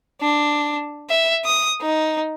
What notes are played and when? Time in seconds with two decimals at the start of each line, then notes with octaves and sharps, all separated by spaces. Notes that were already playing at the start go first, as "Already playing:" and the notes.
0.21 D4
1.10 E5
1.45 D#6
1.82 D#4